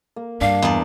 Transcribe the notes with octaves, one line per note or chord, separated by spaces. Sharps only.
A#3
G2 D4 F5
E2 D5 A#5